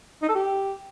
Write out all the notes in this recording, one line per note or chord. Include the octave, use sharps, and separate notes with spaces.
D#4
A4
G4